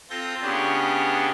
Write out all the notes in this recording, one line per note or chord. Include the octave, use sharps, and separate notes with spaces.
C4 F4 A4 G6 A#6
C#3 B3 C#4 D4 G4